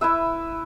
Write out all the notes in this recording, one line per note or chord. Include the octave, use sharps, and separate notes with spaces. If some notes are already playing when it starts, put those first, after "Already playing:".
E4 B4 E5